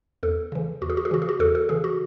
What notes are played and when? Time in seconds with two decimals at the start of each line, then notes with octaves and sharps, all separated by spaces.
0.23 E2 A4
0.52 C#3 E3
0.81 E2 F#4
0.90 G#4
0.97 F#4
1.05 G#4
1.11 C#3 E3 F#4
1.22 G#4
1.29 F#4
1.39 E2 A4
1.55 A4
1.69 C#3 E3 G#4
1.84 F#4